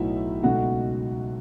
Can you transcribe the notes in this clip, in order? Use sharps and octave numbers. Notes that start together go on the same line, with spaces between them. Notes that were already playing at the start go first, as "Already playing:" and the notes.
Already playing: B1 A2 F#3 B3 D#4 E4 E5
C#2 B2 A3 D#4 F#4 F#5